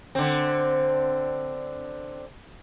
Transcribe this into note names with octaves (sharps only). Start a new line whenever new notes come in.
D3 C4